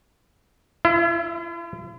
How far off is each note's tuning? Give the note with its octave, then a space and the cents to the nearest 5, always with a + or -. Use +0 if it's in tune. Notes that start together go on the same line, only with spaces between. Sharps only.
E4 +45 E5 +0